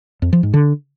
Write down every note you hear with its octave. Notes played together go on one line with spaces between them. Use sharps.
F2
F3
G#2
D3